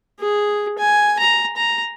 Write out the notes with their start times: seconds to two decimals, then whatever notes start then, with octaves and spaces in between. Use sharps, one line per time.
0.19 G#4
0.78 G#5
1.19 A#5
1.56 A#5